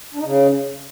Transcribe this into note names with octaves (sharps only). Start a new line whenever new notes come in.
D4
D#4
C#3